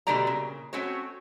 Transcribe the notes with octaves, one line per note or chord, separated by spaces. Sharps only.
B2 D3 G3 A3 D5 A#5
A#2 C#3
A3 C4 C#4 F#4 C#5